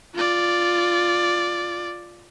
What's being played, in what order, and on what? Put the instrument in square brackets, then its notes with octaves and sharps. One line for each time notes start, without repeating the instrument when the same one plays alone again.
[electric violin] F4 D5